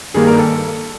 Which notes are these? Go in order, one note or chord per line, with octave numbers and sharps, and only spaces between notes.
G2 D#3 G3 A#3 G#4
A#4
A4